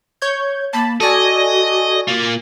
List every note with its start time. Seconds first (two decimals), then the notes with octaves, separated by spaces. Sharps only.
0.22 C#5 G6 G#6
0.73 A#3 A5 B5
1.01 F#4 A4 D5 D#5 G#5
2.08 A#3 F4